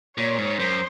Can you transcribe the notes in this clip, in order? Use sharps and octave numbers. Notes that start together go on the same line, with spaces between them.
A#2 C#5
G#2
F#2 C5